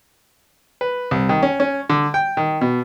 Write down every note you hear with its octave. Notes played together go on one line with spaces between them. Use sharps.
B4
C2
D#3
C#4
C#4
D3
G5
D#3
B2